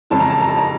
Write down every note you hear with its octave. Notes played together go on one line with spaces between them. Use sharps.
F2 C#3 E3 G#3 A5
A#5
A5
A#5
A5
A#5